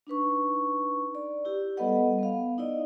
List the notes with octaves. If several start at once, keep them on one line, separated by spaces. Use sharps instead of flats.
D4 D#4 B4 C#6
D5
E4 G4
G3 B3 A4 B4 D#5 F#5
B3 F5
D#4 E4 D5 D#5